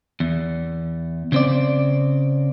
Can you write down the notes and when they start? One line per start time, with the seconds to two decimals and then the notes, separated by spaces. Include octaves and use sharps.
0.20 E2
1.32 C#3 C4 D5